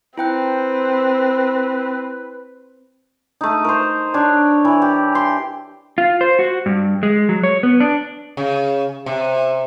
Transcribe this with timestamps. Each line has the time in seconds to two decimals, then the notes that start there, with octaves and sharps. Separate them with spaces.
0.18 C4 E4 B4 G5 F#6
3.41 A3 D#4
3.64 A#4 C5
4.14 D4 C#5
4.65 E3
4.82 G4
5.15 C6
5.98 F4
6.21 C5
6.39 F#4
6.66 G2
7.03 G#3
7.29 F#3
7.43 C#5
7.63 B3
7.80 D4
8.37 C#3
9.06 C3